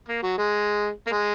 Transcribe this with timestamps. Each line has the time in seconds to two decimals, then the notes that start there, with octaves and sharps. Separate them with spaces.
0.09 A#3
0.23 F#3
0.38 G#3
1.07 A#3
1.12 G#3